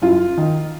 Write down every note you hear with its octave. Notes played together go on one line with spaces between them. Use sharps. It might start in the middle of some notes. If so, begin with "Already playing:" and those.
F#2 F4
D#3